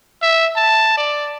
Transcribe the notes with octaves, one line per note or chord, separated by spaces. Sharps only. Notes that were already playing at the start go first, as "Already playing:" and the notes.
E5
A5
D5